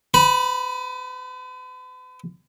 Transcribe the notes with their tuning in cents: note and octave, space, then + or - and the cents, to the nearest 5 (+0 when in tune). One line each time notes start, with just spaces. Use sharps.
B4 +45 B5 -15